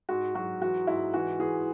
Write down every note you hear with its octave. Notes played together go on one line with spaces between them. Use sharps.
G#2 F#4
F#3 F#4
E3 F#4
G#2 E4
E3 F#4
E3 G#4